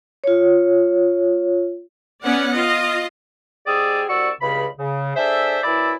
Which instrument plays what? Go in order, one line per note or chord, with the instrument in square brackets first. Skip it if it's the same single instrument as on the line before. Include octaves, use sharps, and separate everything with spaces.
[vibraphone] F4 C#5
[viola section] B3 C#4 D5 F#5
F4 D#5
[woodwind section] G#2 G4 G#4 D5 D#6 E6
C2 F#4 D5 C#6 E6
C#2 G2 C#3 B5
C#3
D4 G#4 A4 C5 E5
F#2 E3 E4 D5 B5 E6